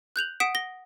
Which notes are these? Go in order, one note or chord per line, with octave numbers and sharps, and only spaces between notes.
F#6 G6 F7 F#7
F#5 D#6 B6 D7 E7
A#6 G7